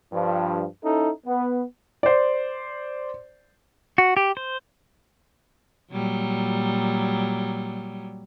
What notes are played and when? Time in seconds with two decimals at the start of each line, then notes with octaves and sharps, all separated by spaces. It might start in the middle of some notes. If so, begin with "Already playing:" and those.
0.12 G2 F3
0.83 C#4 D#4 E4 A4
1.26 B3
2.03 C5 D5
3.98 F#4
4.17 G4
4.37 C5
5.91 A#2 F#3 G3